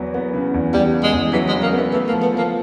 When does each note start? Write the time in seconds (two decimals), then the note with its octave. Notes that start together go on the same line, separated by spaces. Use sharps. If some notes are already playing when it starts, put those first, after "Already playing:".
Already playing: E2 F#3 B3
0.14 B3
0.34 C#3
0.54 E2
0.73 E2 G3
0.94 C#3
1.03 G#3
1.13 E2
1.33 E3 F#3
1.48 G#3
1.53 C#3
1.62 A#3
1.73 E3 B3
1.93 E3 A3
2.08 A#3
2.13 F3
2.22 B3
2.33 F3 A#3